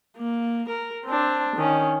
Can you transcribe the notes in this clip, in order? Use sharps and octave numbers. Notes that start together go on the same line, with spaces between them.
A#3
A#4
C4 D4
D#3 C#4